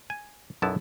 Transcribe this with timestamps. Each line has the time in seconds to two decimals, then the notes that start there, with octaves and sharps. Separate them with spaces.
0.10 G#5
0.62 B1 F#2 B3 E4 A5